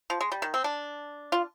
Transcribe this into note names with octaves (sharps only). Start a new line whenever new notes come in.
F3
G#3
G3
D#3
C4
D4
F4